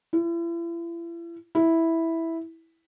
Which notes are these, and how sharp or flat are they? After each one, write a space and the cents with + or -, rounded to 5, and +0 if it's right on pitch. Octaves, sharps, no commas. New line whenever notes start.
E4 +40
E4 -5